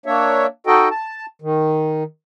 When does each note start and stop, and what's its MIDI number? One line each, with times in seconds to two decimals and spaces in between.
0.06 0.46 58
0.06 0.46 62
0.06 0.46 73
0.06 0.46 76
0.67 0.89 63
0.67 0.89 66
0.67 0.89 69
0.67 0.89 75
0.67 0.89 79
0.91 1.26 81
1.42 2.03 51